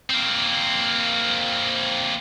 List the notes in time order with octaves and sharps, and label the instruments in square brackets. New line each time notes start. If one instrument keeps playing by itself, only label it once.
[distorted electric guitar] A#3 C4